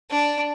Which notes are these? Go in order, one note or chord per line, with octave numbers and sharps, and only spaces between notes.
D4